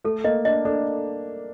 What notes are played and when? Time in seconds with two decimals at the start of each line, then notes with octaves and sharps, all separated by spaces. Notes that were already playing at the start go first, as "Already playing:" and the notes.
0.04 A3 A4
0.24 A#3 D#5
0.45 D4 D#5
0.65 D4 A4